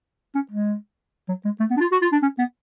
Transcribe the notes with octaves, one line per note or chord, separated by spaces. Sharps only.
C#4
G#3
F#3
G#3
A3
B3
D4
F4
F#4
F4
D4
C#4
B3